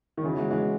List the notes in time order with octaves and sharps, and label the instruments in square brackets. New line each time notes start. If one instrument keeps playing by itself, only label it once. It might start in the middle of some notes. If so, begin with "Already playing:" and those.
[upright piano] D#3
[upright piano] C#3 E3 [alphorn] F#3
[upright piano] E3 G#3
E3 G#3